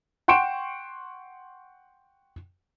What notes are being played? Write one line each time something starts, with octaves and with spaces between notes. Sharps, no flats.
F#5 G5 C6 C#6 D7 E7